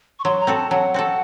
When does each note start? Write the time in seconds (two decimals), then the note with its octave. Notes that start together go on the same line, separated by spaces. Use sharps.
0.19 C#6
0.24 F#3 C6
0.40 A#5
0.47 C4 F#4 A4
0.55 A5
0.70 F#3 F#5
0.94 C4 F#4 A4